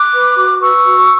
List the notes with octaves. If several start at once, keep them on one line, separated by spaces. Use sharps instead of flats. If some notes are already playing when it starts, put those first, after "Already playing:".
Already playing: D6 F#6
B4
F#4
B4 C#6 E6
F#4